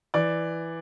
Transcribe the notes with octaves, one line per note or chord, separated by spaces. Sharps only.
E3 D5